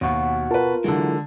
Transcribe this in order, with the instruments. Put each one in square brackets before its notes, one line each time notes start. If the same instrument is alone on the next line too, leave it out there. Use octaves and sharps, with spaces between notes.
[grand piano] D#2 [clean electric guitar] B2 F#4
[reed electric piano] F4 A#4 [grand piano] B4 A5
[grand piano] D3 G#3 [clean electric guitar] E3 F#3